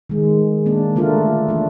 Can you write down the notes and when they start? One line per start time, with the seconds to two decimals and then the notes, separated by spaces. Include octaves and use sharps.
0.10 D#3 G#3
0.66 A#3 D4
0.96 D3 A3 D4 F4 A#4
1.48 E3 D4